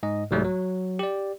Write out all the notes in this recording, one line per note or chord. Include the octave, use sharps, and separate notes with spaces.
G#2 D#5
C2 G#2 F#3 G3 A3
F#3
G4 D5